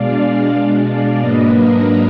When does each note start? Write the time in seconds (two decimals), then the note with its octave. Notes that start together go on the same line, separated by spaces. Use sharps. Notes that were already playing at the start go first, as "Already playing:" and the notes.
Already playing: B2 G#3 D4 D5 F5
0.56 B2 G#3 D4
0.88 D5 F5
1.19 G#2 F#3 A#3 D4 B4 D#5
1.52 A#4